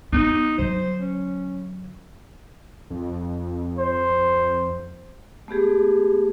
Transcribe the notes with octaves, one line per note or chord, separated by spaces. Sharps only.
B3 D#4
D3 F#3 C5
C#4
F2
C5
A3 B3 G4 G#4